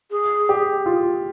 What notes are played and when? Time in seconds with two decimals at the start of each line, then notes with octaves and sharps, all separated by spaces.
0.10 G#4
0.49 G4
0.86 F4